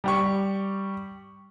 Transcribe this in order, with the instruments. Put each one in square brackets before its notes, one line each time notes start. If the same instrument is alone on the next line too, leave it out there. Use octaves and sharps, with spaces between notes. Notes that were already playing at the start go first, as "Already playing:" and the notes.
[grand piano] G3 G4 C#6